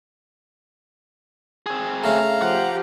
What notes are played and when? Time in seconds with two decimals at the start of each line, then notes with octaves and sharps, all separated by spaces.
1.66 C4 G#4
2.04 C#3 A3 F5 A#5
2.42 F3 G4 F#5